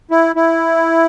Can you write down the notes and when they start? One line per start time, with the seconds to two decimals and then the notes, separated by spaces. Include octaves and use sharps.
0.11 E4
0.36 E4